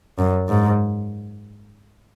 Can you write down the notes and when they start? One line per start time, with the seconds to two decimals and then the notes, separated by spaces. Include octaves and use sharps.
0.19 F#2
0.49 G#2